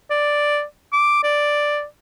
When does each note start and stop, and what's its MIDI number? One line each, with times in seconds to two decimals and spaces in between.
0.10 0.63 74
0.93 1.23 86
1.23 1.84 74